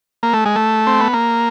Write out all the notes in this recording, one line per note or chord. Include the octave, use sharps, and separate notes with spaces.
A#3
A3
G#3
A3
C4
B3
A#3